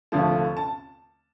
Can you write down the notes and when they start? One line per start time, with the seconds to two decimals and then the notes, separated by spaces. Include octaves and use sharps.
0.12 F1 D#2 D3 F3 A3 A5
0.57 A5